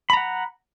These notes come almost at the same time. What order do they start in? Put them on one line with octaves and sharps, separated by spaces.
B5 A#5 F#5